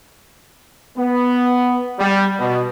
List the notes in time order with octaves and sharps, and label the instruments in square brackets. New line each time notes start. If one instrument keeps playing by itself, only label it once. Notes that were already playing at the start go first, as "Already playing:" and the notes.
[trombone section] B3
G3
B2